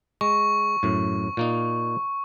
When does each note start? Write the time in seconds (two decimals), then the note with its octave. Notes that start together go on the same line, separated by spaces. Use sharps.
0.21 G#3 C#6
0.83 F#2 A2
1.37 A#2 A#3 D#4